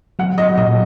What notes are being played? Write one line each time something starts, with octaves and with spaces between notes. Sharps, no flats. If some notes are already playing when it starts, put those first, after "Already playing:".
F#3 F#5
D#5
A#2 D#5